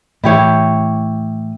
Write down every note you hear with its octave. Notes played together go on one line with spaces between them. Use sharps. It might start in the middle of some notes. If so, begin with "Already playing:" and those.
A2 E3 E4 G4 C#5